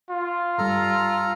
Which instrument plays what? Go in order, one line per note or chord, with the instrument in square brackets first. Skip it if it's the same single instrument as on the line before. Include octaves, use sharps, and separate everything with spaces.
[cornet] F4
[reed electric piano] G2 G3 [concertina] A4 A#5 F6